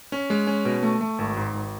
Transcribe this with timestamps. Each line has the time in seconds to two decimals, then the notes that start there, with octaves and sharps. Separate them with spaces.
0.12 C#4
0.30 G#3
0.47 C#4
0.65 B2
0.83 A3
1.01 A3
1.18 G#1
1.37 G#2
1.53 G#1